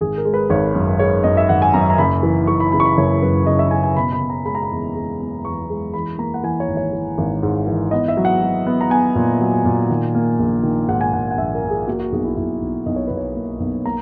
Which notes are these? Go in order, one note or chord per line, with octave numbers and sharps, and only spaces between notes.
G#1 G#4
A#4
G#3
B4
G#1 C#5
F#2
G#3 C#5
F#2 D#5
E5
G#1 F#5
G#5
F#2 A#5
A#5
F#1 B5
E3
E3 C#6
B5
C#3 B5
C#6
B5
F#1 C#5
F#2 B4
C#3 D#5
E5
C#3 G#5
G#5
B2 B5
B5
B2
A#5
G#3 B5
A#5
B5
E2
G#3
B3
E2 C#6
G#3
E3 B5
A#3 A#5
F#5
E3 G#5
C#5
G#1
C#5
E3
G#1
G#2
E3
B3 D#5
E5
F#3
F#5
F#3
B3
A#5
B3 G#5
A#2
F#3
A#2
D#3
A#3
A#1
D#3
G#2 F#5
G#5
G#2 F#5
F#5
A#1 E5
A#4
A#1
G#4
A#3 F#4
F#4
B1 G#4
E4
B1 E4
B1
B1 D#5
C#5
B1 B4
C#5
A#3
B1
A#3 A#5